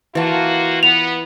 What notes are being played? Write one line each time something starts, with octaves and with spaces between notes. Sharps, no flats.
E3 A#3 F4 F#4 A5
B3 F7